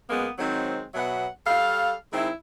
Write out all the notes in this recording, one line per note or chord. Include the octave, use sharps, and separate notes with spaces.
F#2 G#3 A#3 B3
D#3 F#3 G#3 C4
B2 F#3 B3 E5 F#5
G3 A4 F5
D#3 G#3 C4 E4